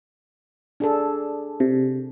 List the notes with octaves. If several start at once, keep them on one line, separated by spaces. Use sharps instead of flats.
D4 G#4 A4
C3